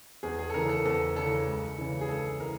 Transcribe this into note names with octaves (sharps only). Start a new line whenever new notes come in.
E2 G#4
G#4
A4
C#3 E3 A#4
A4
E2 A4
C#3 E3 A4
C#2
C#3 E3
G#4
C#2 A4
E3 A#4